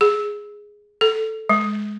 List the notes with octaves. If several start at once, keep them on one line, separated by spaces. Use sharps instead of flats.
G#4
A4
G#3